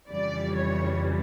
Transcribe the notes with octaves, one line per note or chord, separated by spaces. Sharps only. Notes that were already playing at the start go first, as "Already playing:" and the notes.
F2 C#3 E3 G3 D5
C#5